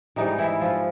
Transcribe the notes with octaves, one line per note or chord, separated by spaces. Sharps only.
G#2 D#3 E3 G3 D#4
E3 E4
F3 F4